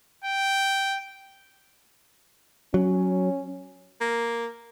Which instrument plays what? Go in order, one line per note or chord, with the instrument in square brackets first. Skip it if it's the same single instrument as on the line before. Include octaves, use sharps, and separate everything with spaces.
[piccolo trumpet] G5
[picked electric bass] F#3 [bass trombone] C#4
[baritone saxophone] A#3